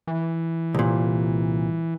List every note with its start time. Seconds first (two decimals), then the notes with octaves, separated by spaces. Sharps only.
0.07 E3
0.75 C2 A#2